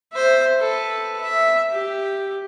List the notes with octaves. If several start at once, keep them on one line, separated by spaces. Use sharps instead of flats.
C5 E5
A4 B4
E5
G4